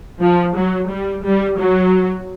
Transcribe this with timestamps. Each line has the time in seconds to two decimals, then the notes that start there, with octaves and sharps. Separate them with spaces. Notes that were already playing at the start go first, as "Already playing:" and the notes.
0.21 F3
0.56 F#3
0.90 G3
1.24 G3
1.58 F#3